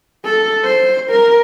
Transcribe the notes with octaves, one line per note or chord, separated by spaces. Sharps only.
A4
C5
A#4